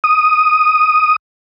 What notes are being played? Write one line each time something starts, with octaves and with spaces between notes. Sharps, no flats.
D#6